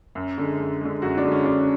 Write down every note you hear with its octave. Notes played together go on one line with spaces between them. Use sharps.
F#2
D3 G#3
F#2
D3 G#3
F#2 F#4
D4
D3 G#3
C#4
F#2 D4